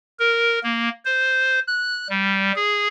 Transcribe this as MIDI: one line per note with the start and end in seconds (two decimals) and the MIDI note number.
0.19 0.59 70
0.63 0.89 58
1.05 1.60 72
1.68 2.08 90
2.10 2.52 55
2.56 2.88 68